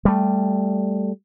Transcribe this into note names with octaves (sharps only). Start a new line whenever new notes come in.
G3 A3